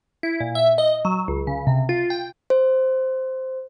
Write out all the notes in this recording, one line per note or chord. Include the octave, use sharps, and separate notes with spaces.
E4
A#2
E5
D#5
F#3
C#2
C#3
C3
F4
G5
C5